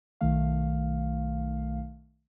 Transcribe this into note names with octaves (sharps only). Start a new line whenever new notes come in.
B1 D#3 A3 F5